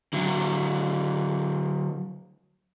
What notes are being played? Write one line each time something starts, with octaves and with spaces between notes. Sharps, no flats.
D3 F#3